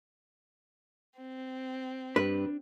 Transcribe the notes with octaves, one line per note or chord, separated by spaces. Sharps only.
C4
G2 D4 B4